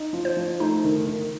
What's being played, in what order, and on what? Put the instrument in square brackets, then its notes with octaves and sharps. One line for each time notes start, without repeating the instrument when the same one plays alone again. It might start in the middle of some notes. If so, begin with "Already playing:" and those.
Already playing: [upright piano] D#4
F3
[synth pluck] C5
[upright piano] F3
[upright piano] A3 [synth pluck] D#4
[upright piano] D#3
D#3